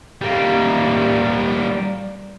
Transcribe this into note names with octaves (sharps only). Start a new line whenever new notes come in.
G3 A#3